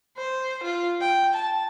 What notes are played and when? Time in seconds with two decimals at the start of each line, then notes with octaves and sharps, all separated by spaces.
0.17 C5
0.63 F4
1.01 G5
1.34 A5